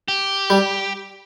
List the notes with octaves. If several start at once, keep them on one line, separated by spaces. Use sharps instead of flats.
G4
G3